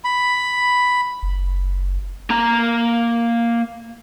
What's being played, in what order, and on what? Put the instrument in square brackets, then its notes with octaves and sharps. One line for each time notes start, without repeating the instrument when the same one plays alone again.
[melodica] B5
[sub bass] F#1
[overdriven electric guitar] A#3 A#5